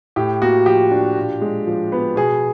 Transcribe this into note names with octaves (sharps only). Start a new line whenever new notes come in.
A2 G4
A#3 F#4
F3 G4
D4
A#2
G#3
F3
B3
B2 G#4